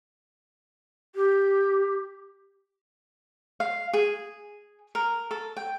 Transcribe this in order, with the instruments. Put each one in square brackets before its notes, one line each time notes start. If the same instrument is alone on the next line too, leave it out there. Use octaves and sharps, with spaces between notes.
[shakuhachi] G4
[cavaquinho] F5
G#4
A#4
A4
G5